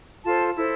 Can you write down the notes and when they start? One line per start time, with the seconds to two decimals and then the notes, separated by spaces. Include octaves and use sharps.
0.24 F4 A4 C5 A5
0.56 E4 A4 C5